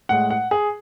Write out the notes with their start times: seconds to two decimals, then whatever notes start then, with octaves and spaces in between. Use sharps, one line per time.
0.09 A2 G#3 F#5
0.30 F#5
0.51 G#4